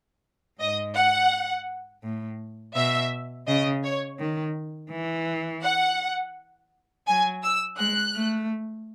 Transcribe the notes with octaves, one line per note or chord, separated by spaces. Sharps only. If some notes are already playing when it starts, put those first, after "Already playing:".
G#2 D#5
F#5
A2
B2 E5
C#3 D#5
C#5
D#3
E3
F#5
F#3 G#5
E6
G#3 F#6
A3